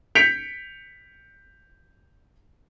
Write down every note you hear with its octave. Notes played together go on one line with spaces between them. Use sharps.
G6 B6 C#7 D7 F7